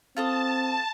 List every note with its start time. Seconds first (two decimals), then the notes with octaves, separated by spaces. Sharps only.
0.17 C4 F4 A4 A5 D#6